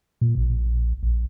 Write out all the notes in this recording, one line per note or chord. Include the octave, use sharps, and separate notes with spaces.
A#2
A#1
A#1